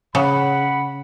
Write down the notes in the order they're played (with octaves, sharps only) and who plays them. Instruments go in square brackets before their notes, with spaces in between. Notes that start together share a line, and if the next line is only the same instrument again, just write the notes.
[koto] C#3 [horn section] F#5 B5